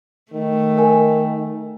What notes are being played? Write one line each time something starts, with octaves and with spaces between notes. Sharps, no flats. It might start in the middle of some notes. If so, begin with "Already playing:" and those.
D#3 A3
A#4 G#5